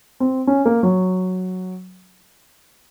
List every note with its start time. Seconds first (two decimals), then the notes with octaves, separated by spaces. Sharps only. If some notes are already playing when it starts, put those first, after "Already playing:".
0.20 C4
0.47 C#4
0.66 A#3
0.83 F#3